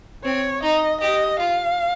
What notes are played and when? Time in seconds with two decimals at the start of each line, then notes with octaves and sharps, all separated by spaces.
0.24 C4 C#5
0.63 D#4 D#5
1.01 G4 D#5
1.39 F4 F5